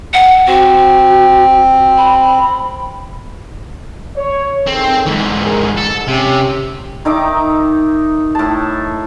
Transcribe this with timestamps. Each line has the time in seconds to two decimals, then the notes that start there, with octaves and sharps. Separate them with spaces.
0.14 F#5
0.47 C4 F#4
1.98 B5
4.16 C#5
4.67 D#3 C4 G#4 A4
5.07 G#2 E3
5.41 G#4 A#4
5.77 G#2 A4
6.07 C3 C#4 G4
7.05 D#3 D#4 E5 D6
8.35 A2 A5